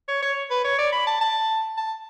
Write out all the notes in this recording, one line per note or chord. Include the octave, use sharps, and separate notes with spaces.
C#5
C#5
B4
C#5
D5
B5
A5
A5
A5